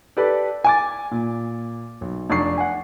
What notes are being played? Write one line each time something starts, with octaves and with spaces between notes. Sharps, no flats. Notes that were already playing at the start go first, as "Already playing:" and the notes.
G4 A4 B4 D5
G#5 D6 A6
A#2
B1
F1 D4 D5 C#6 C7
F#5 G#5